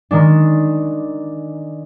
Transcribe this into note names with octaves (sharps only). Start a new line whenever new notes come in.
D#3 G#3 D4